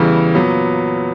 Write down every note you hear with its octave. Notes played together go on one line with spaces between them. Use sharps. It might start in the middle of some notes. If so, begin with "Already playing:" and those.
Already playing: E2 C#3 E3 G3
A#2 F#3 B3